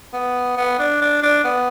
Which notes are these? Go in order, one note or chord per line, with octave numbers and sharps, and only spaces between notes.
B3
B3
D4
D4
D4
B3